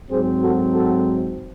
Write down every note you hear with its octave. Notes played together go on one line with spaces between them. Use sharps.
G#2 F#3 C4 G#4 C5
F#4 A4
F#4 A4